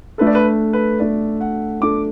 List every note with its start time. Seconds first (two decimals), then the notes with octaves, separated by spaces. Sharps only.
0.18 A3 D4 A4 B4
0.27 D5
0.35 B4
0.73 B4
0.99 A3 D4 A4 D5
1.41 F#5
1.81 A3 D4 A4 D6